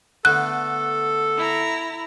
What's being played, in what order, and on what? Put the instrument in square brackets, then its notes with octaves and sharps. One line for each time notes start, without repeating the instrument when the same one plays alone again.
[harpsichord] D3 A3 B3 [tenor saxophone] A4 [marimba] F#6
[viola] E4 A#5